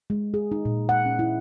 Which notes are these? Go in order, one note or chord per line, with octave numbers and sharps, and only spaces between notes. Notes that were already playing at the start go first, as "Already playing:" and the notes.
G#3
G#4
D#4
A#2
F#5
C#4
E4